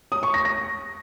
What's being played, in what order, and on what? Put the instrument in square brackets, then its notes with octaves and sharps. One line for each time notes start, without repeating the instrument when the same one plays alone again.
[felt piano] D#6
C#6
A#6
A#6